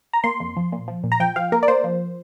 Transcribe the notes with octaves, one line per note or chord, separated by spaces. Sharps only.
A#5
A#3 C6
F2
F3
A#2
F3
A#2
A#5
F3 G5
F3 F5
A#3 A#4
D5
A#3 C5
F3